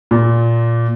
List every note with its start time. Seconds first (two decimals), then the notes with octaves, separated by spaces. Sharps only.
0.11 A#2